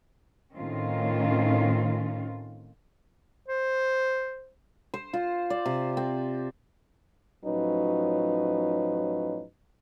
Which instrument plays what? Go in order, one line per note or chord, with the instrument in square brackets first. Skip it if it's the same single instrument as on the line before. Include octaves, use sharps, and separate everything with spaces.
[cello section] A2 D#3 C4 C#4 F4
[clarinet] C5
[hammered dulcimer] C5
F4
D5
C3
C4
[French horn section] A2 F3 F#3 C#4 D#4 B4